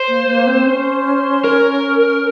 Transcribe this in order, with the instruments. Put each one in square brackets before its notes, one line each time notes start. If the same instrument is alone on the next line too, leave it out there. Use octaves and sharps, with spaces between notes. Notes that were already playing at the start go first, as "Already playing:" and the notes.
Already playing: [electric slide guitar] C5
[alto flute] A#3
A#3
C4
C#4
[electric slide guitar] A#4